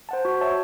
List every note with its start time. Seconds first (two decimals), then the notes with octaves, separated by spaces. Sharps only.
0.09 C5 F#5 A5
0.25 F#4
0.41 C#5 E5 A5